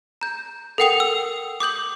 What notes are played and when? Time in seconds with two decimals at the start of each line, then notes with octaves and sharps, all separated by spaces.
0.21 A#5 G6
0.78 A4 A#4 F#5 G5 D#6 F7
1.00 E6
1.60 D6 D#6 G6 F#7